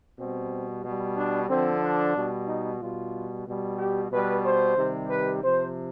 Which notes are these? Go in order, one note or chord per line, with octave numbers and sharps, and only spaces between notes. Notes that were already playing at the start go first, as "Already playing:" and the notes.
B2 G3 C4
B2 G3
D4
D3 F3 C4
D4
B2 G3
D#4
B2 G3 F4
B2 G3
G4
B2 G3 B4
C5
C3 D#3 G3
B4
C3 F3 C5